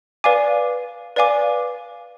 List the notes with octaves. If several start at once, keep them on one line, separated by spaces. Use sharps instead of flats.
B4 D5 F5 G#5 D6
B4 D5 F5 G#5 D6